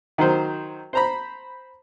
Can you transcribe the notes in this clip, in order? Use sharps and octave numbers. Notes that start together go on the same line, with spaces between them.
D#3 F#3 C5
C5 A#5 B5